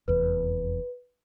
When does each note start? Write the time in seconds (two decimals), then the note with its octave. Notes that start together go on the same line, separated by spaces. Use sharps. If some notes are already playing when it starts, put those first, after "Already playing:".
0.08 F1 E2 B4